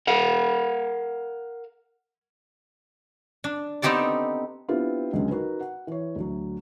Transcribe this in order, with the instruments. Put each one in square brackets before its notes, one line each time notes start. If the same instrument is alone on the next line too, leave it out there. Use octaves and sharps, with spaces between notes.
[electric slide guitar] A#4 F5 F#5
[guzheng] D4
B3 C4 D#4 G4 A4 D5
[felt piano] B3 C4 D4 E4 F4 G4
C#2 D3 F#3 G#3 C#4
D#4 F#4 A#4 B4
F#5
E3 C#5
D2 F#3